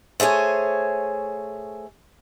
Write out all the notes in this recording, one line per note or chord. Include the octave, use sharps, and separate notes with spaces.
A3 G#4 C5 C#5 G#5